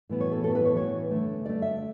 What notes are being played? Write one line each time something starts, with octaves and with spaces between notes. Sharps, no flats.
A2 E3 B3
C#5
A4
A2 E3 B3 A4
B4
C#5
A2 E3 B3 C#5
D3 A3
D3 A3 D5
E5